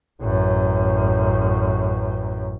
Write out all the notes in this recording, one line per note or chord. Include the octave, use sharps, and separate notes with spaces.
A1 F#2